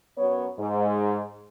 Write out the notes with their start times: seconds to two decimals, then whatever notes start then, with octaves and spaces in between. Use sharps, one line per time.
0.18 F#2 F#3 B3 C#5
0.59 G#2